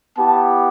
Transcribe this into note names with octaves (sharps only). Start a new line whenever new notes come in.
B3 E4 G4 A5